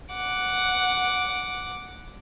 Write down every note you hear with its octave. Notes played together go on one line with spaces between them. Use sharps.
F#5 D6